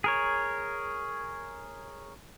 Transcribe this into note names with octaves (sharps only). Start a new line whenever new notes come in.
G#4 A#4 C#5